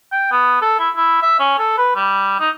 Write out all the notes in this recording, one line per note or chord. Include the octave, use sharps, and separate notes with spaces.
G5
B3
A4
E4
E4
E5
C#4
A4
B4
G3
D#4